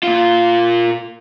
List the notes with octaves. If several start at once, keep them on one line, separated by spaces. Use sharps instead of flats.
A#2 F4